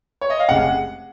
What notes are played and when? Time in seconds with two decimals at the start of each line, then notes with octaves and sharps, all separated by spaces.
0.21 C#5
0.30 D#5
0.40 F5
0.49 F1 C#3 G#3 F#5